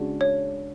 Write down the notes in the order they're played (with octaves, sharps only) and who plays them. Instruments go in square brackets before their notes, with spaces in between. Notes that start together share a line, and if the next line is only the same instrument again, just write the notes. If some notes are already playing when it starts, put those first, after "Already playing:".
Already playing: [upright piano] C#3 G#3 D4 F#4
[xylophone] C#5